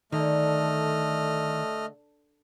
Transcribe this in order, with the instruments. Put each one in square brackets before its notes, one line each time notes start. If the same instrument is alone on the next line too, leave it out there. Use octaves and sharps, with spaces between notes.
[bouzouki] D3 [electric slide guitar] D#3 [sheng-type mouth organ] A3 D#5 F6